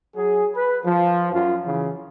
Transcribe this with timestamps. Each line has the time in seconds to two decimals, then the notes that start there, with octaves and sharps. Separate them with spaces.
0.16 F#3 G#4
0.55 B4
0.85 F3
1.33 F#2 F4
1.66 C#3 E3